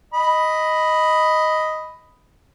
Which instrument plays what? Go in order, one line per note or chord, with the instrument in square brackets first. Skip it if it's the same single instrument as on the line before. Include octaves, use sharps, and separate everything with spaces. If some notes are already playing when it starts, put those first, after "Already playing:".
[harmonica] D#5 B5